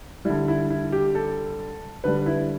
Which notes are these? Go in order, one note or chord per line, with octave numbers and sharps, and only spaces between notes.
D3 G3 E4
E4
E4
G4
A4
D3 G3 B4
E4